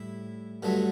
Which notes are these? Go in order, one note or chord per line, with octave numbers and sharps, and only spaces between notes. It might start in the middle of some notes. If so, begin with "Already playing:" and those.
Already playing: A2 G3 E4
G2 D3 F#3 A3